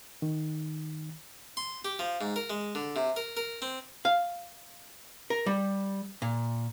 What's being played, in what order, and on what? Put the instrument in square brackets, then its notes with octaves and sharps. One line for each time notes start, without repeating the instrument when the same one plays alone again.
[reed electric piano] D#3
[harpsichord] C6
G4
F3
G#2
A#4
G#3
D3
C3
A#4
A#4
C4
[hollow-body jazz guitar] F5
A#4
G3
A#2